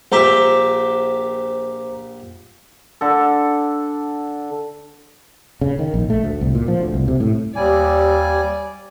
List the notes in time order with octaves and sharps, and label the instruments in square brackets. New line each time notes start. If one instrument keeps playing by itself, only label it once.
[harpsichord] A#1 G4 E5 [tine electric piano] C5 A#5 D6
[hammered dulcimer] D3 A4
[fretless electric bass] C#3
D#3
A#1
A3
D2
C2
A#2
F3
D2
C2
C3
A2
[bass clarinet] D#2 [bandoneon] G3 G#5 [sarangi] D5